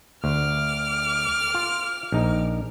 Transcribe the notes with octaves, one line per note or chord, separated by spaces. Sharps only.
D2 D6 F6
F4
A#1 D#4